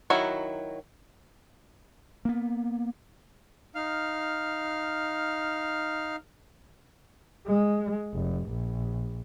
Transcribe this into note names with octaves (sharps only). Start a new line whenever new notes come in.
D#3 F#3 E4 F#4
A#3 B3
D#4 F5 F6
G#3
F1
A#1